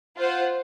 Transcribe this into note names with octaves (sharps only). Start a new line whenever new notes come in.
F4 C5 F#5